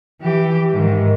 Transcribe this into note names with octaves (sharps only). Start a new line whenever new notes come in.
E3 G4
G#2 D#3